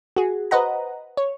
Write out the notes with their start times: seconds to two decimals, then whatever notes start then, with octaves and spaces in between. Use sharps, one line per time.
0.16 F#4 G#4
0.51 B4 C5 D#5 F#5 A#5
1.17 C#5